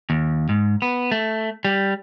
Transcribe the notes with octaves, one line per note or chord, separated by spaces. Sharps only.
D#2
G#2
B3
A3
G3